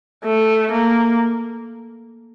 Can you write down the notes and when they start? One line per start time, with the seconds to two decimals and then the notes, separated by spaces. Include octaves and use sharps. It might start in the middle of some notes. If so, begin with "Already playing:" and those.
0.24 A3
0.72 A#3